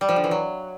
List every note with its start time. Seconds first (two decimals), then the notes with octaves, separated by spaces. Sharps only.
0.01 G3
0.09 F3
0.16 D3
0.24 E3
0.31 F#3